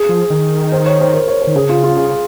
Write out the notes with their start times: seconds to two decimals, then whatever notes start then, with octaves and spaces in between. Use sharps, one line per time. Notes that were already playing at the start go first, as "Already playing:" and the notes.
Already playing: G#4
0.09 F3
0.30 D#3
0.72 C5
0.86 C#5
1.00 C5
1.13 A#4
1.28 C#5
1.42 C5
1.47 D#3
1.56 C#3 G#4
1.69 F4
1.84 F4
1.97 G#4